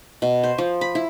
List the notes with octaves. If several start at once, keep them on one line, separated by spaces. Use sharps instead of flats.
B2
C5
F3
B5
E4